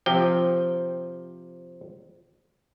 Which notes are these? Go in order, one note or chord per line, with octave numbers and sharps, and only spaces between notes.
C3 F3 G5